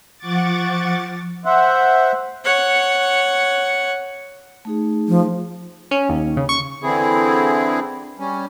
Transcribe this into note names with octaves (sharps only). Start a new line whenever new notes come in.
F3 F#5 C#6 D6 A6
C5 E5 F#5
C#5 F#5
A3 D#4 G#4
F3
C#4
D#2
C#3
C#6
D3 E3 C4 E4 G#4
G3 C#4